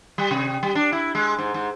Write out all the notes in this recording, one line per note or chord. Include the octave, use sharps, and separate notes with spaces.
G3
C3
G3
D4
E4
G#3
G#2
G#2